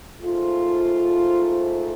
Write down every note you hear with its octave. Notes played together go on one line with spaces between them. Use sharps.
G#2 F3 A3 F4